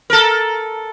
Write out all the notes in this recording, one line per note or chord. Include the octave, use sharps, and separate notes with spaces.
A4 A#4